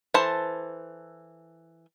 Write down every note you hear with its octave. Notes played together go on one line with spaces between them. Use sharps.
E3 A4 C5 A5